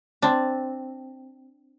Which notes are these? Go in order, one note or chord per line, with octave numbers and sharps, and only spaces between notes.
C4 D4